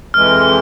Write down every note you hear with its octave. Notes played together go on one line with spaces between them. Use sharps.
F2 E3 G#3 F6